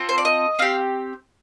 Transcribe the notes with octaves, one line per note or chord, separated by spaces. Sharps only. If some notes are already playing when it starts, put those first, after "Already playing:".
Already playing: C4 F4 A4
C5
D5
D#5
C4 G4 F5